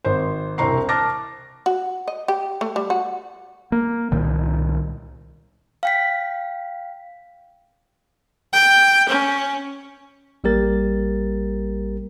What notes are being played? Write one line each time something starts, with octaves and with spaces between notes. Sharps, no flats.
G#1 C5
E1 C2 C4 A#5 C#6 C7
A5 D6 F6 F#6 A6 A#6
F#4
D#5
G4
A3
G3
F#4
A#3
C2 A#2 D#3
F5 G5 B6
G5
C#4
A1 G3 A#3 G4 A#4 A6